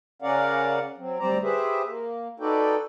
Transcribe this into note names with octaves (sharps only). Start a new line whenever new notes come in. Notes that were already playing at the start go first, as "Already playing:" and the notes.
C#3 C#4 A#4 D5 F5 F#5
F#3 C4
D2 G3 C4 C5 D5 A#5
G4 G#4 B4 C5 E5
A#3
D#4 F#4 A4 B4 D5 G5